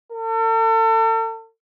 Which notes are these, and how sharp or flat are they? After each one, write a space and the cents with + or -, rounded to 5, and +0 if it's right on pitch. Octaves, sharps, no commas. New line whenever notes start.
A4 +40